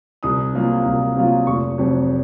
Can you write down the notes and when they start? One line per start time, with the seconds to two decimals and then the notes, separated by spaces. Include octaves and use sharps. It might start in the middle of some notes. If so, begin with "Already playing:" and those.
0.23 C2 D#6
0.53 C3 F#3 A#3 F4
0.85 C2
1.16 C3 F#3 A#3 F4
1.47 F1 C#6
1.78 F2 C3 F#3